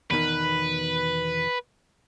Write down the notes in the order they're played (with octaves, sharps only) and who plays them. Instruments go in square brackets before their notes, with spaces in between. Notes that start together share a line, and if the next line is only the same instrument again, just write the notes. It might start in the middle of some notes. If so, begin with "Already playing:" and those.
[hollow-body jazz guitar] E2 B2 D#3 [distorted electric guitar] B4